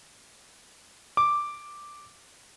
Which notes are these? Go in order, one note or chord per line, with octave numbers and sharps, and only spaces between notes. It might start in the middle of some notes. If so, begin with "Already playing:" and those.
D6